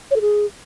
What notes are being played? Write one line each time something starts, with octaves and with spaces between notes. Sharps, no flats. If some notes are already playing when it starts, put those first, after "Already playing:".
C#5
A4
G#4